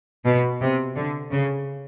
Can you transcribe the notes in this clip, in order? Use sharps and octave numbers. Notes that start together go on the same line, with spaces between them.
B2
C3
D3
C#3